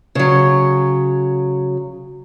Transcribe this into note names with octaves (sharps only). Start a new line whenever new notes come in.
C#3 F#3